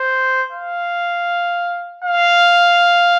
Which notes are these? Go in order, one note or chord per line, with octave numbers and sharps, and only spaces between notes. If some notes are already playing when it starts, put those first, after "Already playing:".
Already playing: C5
F5
F5